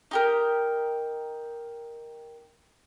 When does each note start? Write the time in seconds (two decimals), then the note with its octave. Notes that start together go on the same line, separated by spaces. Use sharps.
0.11 D#4 G4 A#4